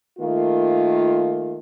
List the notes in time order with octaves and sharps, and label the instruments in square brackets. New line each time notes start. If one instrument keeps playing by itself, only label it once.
[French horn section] D#3 A3 A#3 F4